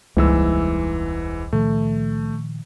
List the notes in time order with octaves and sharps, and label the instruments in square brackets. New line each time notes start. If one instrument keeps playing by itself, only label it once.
[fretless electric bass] E1 G3 A#3 [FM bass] C#2 [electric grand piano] G#2 E3 E6
[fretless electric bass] A#2 D#3 F3 [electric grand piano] A3